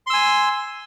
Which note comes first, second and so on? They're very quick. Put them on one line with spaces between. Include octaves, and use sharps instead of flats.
C6 E6 G#5